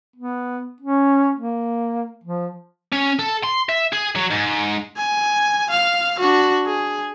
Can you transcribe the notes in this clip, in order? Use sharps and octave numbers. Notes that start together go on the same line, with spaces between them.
B3
C#4
A#3
F3
C#4
A4
C6
E5
G#4
F#3
G#2
G#5
F5
D4 F#4
G#4